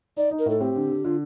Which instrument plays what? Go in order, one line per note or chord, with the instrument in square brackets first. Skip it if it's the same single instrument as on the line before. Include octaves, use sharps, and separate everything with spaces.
[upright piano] D#4 [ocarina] D5
[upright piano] D#4
[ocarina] A#4
[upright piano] A2 [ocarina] A4
[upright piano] C4 [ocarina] G4
[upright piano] D3
D3
[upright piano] D3 [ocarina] F4